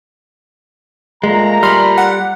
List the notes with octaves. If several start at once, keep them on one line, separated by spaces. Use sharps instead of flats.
A#2 G#3 A3 A#5
G3 B5 C6 F6
F#5